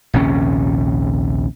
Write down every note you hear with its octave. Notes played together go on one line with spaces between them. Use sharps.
A#1 D#2 C3 C#4